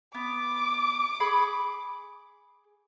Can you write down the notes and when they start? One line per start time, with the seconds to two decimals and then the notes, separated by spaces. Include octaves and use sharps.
0.14 B3 D6
1.20 G#4 B5 C6